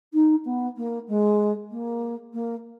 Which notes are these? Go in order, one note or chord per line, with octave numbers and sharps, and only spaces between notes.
D#4
B3
A#3
G#3
A#3
A#3